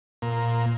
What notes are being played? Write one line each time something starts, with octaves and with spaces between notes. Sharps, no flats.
A#2